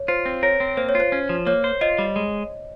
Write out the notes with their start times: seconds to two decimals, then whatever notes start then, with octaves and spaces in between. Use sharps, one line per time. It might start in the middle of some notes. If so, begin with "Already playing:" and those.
Already playing: C#5
0.08 F4 C5
0.26 C4
0.43 A#4 C#5
0.60 C4
0.77 A#3 C5
0.89 C#5
0.95 F4
1.00 C5
1.12 C#4
1.29 F3
1.47 A#3 C#5
1.64 C5
1.81 F4 D#5
1.98 G3
2.16 G#3